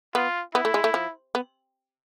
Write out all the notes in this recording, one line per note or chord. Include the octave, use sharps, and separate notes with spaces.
B3 F4
B3 E4
A3
G#3
A3
F3
B3